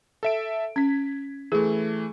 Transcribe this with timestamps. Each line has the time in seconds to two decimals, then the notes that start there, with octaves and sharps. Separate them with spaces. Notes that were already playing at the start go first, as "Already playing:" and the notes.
0.23 A4 E5 D7
0.76 C#4 G#6 B6
1.52 E3 A3 G#4